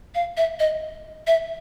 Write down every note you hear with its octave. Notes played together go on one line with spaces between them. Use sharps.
F5
E5
D#5
E5